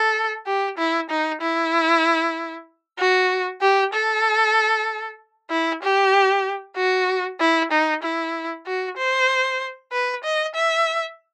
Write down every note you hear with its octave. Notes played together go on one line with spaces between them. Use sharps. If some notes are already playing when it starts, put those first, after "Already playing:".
Already playing: A4
G4
E4
D#4
E4
F#4
G4
A4
E4
G4
F#4
E4
D#4
E4
F#4
C5
B4
D#5
E5